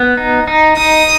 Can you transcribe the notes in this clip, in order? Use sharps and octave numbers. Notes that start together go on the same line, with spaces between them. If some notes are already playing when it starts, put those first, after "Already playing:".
Already playing: B3
D#4
D#4
D#4 D#6